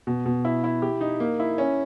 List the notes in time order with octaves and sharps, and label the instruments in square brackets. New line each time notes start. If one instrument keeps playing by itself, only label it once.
[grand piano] B2
B2
E4
E4
G4
D#4
A#3
E4
C#4